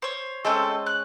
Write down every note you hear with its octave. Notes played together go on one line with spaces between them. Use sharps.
C5 C#5
G#3 A3 C4 C#4 A4 D#5
F#6